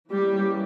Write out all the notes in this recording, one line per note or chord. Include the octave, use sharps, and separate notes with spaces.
E3 G3 A#3 C#4 G4